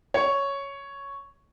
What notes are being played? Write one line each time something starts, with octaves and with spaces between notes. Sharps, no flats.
C#5